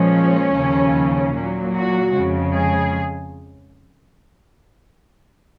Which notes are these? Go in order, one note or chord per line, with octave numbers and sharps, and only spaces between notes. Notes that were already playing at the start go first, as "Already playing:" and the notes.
Already playing: A#2 F3 G#3 C#4
D#2 C#3 F3
A#2 F#3
F#4
F2 C#3 G#3
G#4